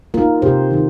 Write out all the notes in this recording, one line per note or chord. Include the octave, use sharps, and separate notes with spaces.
A#3 D#4 F4 A#4
C3 G4 C5
D#3 A#3 D#4